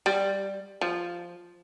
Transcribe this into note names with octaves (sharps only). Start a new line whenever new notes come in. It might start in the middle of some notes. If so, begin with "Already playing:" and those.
G3
F3